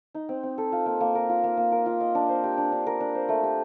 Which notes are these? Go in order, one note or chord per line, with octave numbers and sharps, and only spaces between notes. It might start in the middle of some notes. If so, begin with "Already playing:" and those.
D#4
C4
C4
A4
F4
A#3
A#3
A#4
F4
A#3
A#3
A#4
F4
D#5
D4
C5
G4
D4
D4
A#4
D4
C5
A3
G4